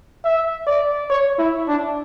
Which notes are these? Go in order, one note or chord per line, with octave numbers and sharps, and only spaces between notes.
E5
D5
C#5
E4
D4